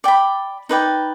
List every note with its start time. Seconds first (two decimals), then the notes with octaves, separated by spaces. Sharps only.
0.04 D5 G5 B5
0.69 D#4 B4 D5 G5